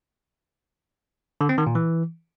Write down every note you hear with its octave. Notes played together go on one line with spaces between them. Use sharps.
D3
C4
D#3
A#2
E3